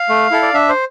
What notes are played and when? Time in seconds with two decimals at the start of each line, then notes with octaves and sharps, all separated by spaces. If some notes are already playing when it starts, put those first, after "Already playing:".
Already playing: F5
0.09 A3
0.31 E4 A4
0.42 D5
0.54 D4 E5
0.69 C5